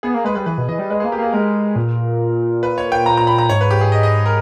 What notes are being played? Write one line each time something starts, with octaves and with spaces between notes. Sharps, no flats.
B3 G#4
A#3
G#3 B4
G3 B4
E3 B4
B2
E3 D#5
G3
G#3 B4
A#3 G#4
G4
A#3 G#4
G#3 A#4
A#2
B4
C#5
G5
A#5
A#5
B5
A#5
G#2 C#5
B4
G4
G#4
D#5
D#5
A#4